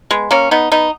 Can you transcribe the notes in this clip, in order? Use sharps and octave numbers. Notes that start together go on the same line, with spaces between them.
G#3 B3
A#3 C#4
B3 D#4
B3 D#4